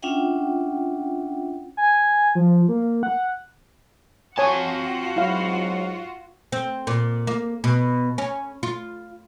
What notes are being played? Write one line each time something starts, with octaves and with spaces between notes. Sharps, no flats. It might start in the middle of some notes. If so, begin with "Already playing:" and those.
C#4 D4 F4 E5 F#5 G5
G#5
F3
A#3
F#5
C4 F4 F#4 C#5 G#5 A5
G#2 F#3 E4 F5
C4
A#2
A#3
B2
C#4
F4